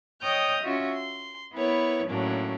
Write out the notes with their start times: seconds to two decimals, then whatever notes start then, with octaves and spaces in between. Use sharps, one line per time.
0.22 C#5 D#5 G5 D#6 F6 G6
0.62 C#4 F4 F#4 E5
0.94 C6
1.53 B3 E4 A#4 B4 C#5
2.07 A2 F#3 A#3 C#4 D4